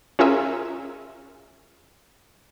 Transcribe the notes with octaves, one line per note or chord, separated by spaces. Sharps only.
C#4 F4 G#4 A#4 E5 G#5